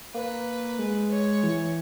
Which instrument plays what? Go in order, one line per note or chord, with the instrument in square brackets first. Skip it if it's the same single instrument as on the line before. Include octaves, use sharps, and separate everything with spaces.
[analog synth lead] A#3 [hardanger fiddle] B4
[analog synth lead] G#3
[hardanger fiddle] C#5
[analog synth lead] E3